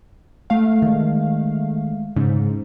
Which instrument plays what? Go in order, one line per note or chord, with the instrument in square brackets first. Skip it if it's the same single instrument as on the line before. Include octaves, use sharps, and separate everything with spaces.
[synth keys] A3 F5
[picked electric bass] D#3 G#3
[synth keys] G#2 [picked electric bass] C#3 C#4